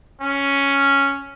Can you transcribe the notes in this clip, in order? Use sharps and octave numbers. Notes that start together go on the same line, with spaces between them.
C#4